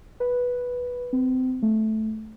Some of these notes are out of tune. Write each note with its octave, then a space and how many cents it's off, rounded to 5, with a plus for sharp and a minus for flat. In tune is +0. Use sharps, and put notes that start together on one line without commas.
B4 -5
C4 -30
A3 -10